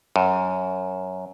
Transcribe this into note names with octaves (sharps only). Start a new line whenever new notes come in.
F#2